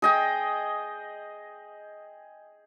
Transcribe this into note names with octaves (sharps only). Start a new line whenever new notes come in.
G#4 D#5 G5